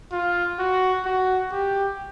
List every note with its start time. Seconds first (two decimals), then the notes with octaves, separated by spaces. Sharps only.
0.12 F4
0.59 F#4
1.05 F#4
1.52 G4